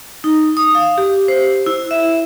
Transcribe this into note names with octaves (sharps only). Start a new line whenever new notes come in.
D#4
D#6
F5
G4
C5
E4
E5